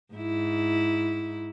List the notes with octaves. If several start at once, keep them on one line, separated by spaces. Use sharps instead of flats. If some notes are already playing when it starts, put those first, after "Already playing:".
G#2 E4